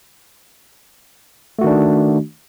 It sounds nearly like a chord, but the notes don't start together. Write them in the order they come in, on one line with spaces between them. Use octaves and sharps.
A3 F#4 D#3 D4